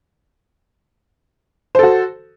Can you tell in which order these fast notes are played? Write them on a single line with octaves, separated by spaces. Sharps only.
C5 A4 F#4